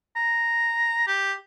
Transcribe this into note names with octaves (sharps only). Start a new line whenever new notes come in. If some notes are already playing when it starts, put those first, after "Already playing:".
A#5
G4